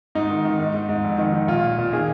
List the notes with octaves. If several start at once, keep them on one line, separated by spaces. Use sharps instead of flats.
G#2 D#4
D#3
D#3
G#2
G#2
G#2
F2
D#3
D#3
A#2 F4
A#2
A#2
D#3 G#4